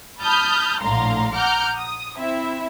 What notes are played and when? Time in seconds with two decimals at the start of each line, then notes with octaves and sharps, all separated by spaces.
0.21 A5 B5 D#6 F6 G6
0.81 A#1 A2 D3 F5 A#5 C6
1.34 F#5 A#5 D6 F6 G6
1.77 D#6
2.16 C4 E4 E5